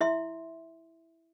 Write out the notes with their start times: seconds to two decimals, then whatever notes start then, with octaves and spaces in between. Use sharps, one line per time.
0.01 E4 E5 C6